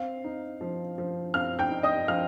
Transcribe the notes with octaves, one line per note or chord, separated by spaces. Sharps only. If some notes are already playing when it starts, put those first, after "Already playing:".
Already playing: C4 F5
D#4
F3
F3
C4 F5 F6
G5 G6
D#4
D#5 D#6
F3 F5 F6